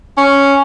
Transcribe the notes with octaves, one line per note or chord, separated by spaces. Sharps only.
C#4